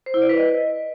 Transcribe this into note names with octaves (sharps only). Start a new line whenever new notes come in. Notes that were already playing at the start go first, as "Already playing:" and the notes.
C5
E4
D5
B4
D#5